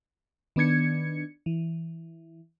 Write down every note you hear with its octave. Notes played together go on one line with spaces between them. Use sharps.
D#3 B3 D4 G#6 C#7
E3